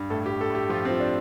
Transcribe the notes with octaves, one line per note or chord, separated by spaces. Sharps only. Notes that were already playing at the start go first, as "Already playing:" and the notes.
Already playing: G2
A2 A4
G4
A2
A4
A2 G4
F3 F4
C4
F3
D4